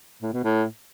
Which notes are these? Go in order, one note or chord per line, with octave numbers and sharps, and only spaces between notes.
A2
B2
A2